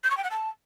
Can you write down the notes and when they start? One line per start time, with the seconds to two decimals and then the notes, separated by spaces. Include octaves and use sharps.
0.03 G6
0.10 C#6
0.17 G5
0.23 F#5
0.30 A5